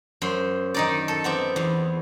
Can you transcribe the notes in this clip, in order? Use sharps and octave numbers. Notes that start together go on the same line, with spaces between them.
F#2 C5
D#3 D#4 D5
A4
B3 C4 D5 E5
E2